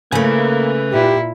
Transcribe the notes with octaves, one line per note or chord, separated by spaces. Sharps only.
C#3 A3 A#3 B4 G#5
A#2 E4 G4